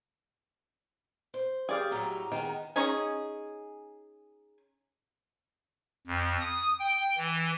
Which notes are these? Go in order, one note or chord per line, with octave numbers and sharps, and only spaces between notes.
C5
G4 G#4 D5 F5
A2 F#3 G3 A#5
D#3 G#3 B3 G5
C#4 D#4 G#4
F2
D#6
G5
E3